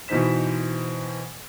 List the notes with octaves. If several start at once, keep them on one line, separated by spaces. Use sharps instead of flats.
B2 E3 D#4 C5 B6 E7